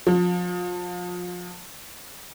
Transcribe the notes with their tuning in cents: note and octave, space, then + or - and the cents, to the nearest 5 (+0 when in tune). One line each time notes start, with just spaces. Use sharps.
F3 +30